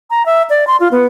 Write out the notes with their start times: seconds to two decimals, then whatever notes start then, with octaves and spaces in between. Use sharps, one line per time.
0.10 A#5
0.26 E5
0.50 D5
0.67 C6
0.80 F4
0.92 B3